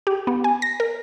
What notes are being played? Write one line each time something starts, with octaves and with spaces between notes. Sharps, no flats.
G4
B3
G#5
A#6
A#4